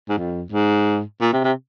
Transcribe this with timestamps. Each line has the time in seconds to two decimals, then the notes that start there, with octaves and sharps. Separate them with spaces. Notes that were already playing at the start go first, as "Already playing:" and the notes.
0.09 G#2
0.18 F2
0.52 G#2
1.21 A#2
1.33 C3
1.44 C3